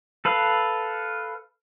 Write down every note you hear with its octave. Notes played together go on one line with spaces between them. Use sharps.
A4 B4 F5